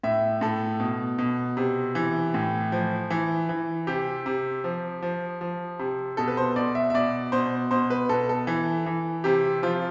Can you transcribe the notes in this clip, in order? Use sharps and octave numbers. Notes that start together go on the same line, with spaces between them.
A2 E5
A2 A4
B2
B2
C3
E3
A2
F3
E3
E3
C3 G4
C3
F3
F3
F3
C3
B2 A4
B4
C5
B2 D5
E5
E5
B2 D5
B2 C5
B2 C5
B4
B2 A4
A4
E3
E3
C3 G4
F3 F4